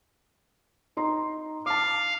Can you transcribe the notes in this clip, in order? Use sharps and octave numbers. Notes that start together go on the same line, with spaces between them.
D#4 A#5 C6
F5 A5 D6